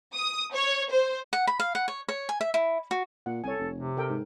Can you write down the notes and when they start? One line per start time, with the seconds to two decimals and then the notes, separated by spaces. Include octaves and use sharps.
0.16 D#6
0.53 C#5
0.90 C5
1.33 F#5
1.47 B5
1.60 F5
1.75 F#5
1.88 C#5
2.08 C#5
2.29 G#5
2.41 E5
2.54 E4
2.91 F#4
3.26 A#2 F#5
3.44 C2 A4 C#5 G#5
3.59 F1
3.74 C3
3.97 A4 A#4 G5
4.09 G#2